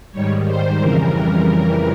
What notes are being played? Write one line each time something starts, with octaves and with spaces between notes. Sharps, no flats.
G#2 D#3 G3 C#5
C5
F2 C#3 E3 G3 A#4
A#4